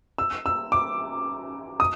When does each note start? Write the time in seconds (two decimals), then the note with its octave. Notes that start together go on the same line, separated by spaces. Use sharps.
0.18 E6
0.46 E6
0.72 D6
1.80 D#6